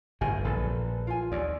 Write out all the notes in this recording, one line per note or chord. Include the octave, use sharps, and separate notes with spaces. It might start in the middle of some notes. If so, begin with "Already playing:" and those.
G1 A2 C5 G#5
A#1 A4 B4
F4 G#5
D#2 D5